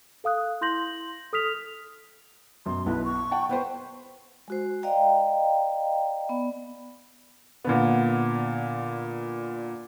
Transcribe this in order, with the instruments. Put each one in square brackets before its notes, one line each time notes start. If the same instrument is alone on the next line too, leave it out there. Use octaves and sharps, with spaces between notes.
[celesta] A4 F5 D#6 F#6
E4 C6 G6 A#6 F#7
A4 D#6 F6 B6 F7
[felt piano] F#2 B2 [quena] C6
[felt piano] B1 B2 E4 [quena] B4
[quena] C#6
[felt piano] F#5 G5 A5
[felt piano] B3 B4 C5 [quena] G5
[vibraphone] G#3 F#4 C5
D5 D#5 F5 G5 A#5
B3 D5
[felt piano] A#2 D3 B3